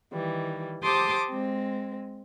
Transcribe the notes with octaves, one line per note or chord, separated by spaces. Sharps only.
D#3 E3 G3
G4 C5 A5 C6 D6 D#6
G#3 C4